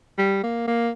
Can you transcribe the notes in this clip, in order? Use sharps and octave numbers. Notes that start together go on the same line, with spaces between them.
G3
A#3
A#3